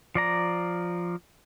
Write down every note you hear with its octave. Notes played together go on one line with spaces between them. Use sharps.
F3 D5 A#5